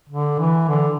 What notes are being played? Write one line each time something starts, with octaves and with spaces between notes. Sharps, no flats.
D3
E3
D3